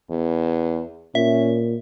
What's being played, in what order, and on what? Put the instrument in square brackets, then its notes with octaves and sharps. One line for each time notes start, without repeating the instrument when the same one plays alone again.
[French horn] E2
[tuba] A#2 [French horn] C#4 [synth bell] E5